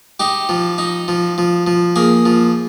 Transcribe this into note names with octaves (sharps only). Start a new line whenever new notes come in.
D#4 G4
F3
D#4
F3
F3
F3
A#3 G#4
F3